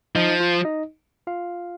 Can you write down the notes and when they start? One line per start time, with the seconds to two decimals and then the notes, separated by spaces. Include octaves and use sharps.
0.16 F3 D#4 D#5
0.40 F4 F5
0.65 D#4 D#5
1.27 F4 F5